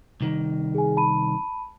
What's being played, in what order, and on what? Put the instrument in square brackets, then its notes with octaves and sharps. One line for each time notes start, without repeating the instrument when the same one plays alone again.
[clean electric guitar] C2 D#3
[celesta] G#4 G#5
A5 B5 D#7